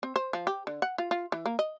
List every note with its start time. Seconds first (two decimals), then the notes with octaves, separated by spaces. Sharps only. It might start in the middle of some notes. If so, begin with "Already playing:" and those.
0.03 C4
0.16 C5
0.33 F3
0.47 G4
0.67 D3
0.82 F#5
0.98 F4
1.11 F4
1.32 E3
1.46 A#3
1.59 D#5